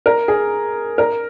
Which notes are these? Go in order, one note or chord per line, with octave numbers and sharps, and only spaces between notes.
A#4
G#4
A#4